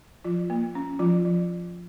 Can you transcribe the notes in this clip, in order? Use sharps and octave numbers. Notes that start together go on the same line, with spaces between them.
F3 F4
A#3
C#4
F3 F4
F3